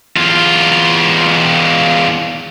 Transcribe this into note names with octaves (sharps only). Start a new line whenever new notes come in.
E2 F4